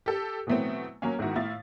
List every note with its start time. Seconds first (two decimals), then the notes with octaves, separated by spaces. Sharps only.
0.06 G4 A4
0.47 B2 E3 F#3 A3 B3 C4
1.02 F#3 A#3 C#4
1.19 G#2 D#3 E4 F#4
1.35 A2 E4 F4 A6